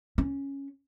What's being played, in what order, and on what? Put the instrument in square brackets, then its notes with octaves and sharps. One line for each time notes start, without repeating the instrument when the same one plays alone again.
[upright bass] C#4